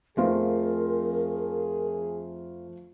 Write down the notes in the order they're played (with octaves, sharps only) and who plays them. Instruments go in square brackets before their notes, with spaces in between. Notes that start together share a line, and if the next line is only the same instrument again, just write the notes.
[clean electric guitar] F2 [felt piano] A3 F4 C5 [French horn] G#4 [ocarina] A#4